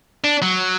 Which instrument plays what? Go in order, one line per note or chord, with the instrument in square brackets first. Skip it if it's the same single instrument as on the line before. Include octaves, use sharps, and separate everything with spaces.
[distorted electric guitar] D4
F#3